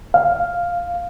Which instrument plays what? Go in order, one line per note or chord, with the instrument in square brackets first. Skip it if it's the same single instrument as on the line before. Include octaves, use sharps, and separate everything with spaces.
[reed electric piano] F5